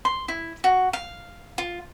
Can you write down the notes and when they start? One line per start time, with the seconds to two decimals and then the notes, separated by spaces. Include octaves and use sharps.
0.05 C6
0.28 E4
0.64 F#4
0.93 F5
1.58 F4